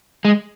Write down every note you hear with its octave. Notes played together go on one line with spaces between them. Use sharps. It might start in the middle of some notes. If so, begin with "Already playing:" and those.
G#3